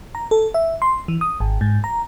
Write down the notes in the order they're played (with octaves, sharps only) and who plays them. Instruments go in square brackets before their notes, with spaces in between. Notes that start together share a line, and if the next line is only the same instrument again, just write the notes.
[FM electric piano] A#5
A4
E5
C6
E3
D#6
G#1
G#2
A#5